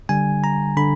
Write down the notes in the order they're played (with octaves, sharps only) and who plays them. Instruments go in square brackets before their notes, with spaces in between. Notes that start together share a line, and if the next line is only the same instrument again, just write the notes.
[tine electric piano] D3 G3 G#5
A#5
D3 B5